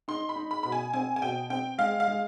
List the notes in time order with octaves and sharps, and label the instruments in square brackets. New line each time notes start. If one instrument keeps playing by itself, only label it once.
[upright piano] D#4 [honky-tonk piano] C6
[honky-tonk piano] B5
[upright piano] D#4
[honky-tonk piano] B5
[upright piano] B2 [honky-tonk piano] B5
[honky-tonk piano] G#5
[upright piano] C4 [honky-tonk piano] G#5
[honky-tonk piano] G#5
[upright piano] B2 [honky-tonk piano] G5
[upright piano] C4 [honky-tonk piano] G5
[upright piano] G#3 [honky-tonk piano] F5
[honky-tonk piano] F5
[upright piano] G#3